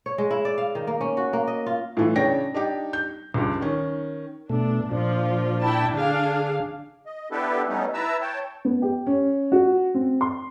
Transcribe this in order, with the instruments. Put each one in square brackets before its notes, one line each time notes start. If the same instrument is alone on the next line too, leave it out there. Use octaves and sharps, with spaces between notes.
[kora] C#5
G#3
E4
D5
F5
D#3
A#3
C#4
F#4
A#3
D#5
F4
[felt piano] A2 E3 F4
C#3 D4 C#5 G5 A#6
D4 D#4 G4
G6
C#2 G2
D#3 C#4
[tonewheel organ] B2 A3 [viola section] D4
[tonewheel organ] A#2 D4 [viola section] F3 F4
[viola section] E4 G5 A5
[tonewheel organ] D3 [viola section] D4 G#4 F5
[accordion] D#5
B3 D4 E4 G4 A4 B4
G3 A3 B3 C#4 D#4
E4 B4 E5 A5 A#5 E6
C#5 G5 A5
[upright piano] B3
G4
C#4
F#4
C4
C6